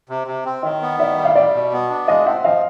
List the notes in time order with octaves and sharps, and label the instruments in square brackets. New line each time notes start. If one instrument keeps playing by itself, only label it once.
[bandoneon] C3
C3
C4
[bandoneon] D#3 [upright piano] C#5 D#5
[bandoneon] B3
[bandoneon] D#3 [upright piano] D5 E5
[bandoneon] G3
[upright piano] F5
[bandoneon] G3 [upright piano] D5 E5
[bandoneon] B2
B3
D4
[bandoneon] G#3 [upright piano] D#5 F5
[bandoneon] C4 [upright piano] E5 F#5
[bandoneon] F3 [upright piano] D#5 F5